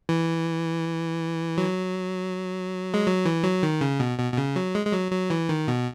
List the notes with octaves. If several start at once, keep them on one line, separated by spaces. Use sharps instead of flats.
E3
F#3
G#3
F#3
E3
F#3
D#3
C#3
B2
B2
B2
C#3
F#3
G#3
G#3
F#3
F#3
E3
D#3
B2